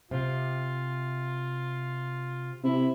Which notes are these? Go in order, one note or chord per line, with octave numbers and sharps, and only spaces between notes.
C3 F4
C3 E4